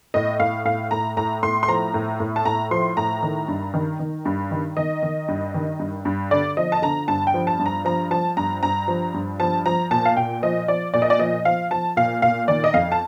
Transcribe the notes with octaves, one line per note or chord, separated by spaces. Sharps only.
A2 D#5
A2 F5
A2 F5
A2 A#5
A2 A#5
A2 C6
C6
F3 A#5
A2
A2
A5
A2 A#5
F3 C6
A2 A#5
D#3
G2
D#3
D#3
G2
D#3
D#3 D#5
D#3
G2
D#3
G2
G2
D3 D5
F3 D#5
A5
D3 A#5
G2 A5
G5
F3
A5
G2
A#5
F3 A#5
F3 A5
G2 A#5
G2 A#5
F3
G2
F3 A5
F3 A#5
A#2 A5
F5
A#2 G5
F3 D#5
F3 D5
A#2 D5
D#5
D5
F3 D#5
F3 F5
F3 A5
A#2 F5
A#2 F5
D#3 D5
D#5
F2 F5
A5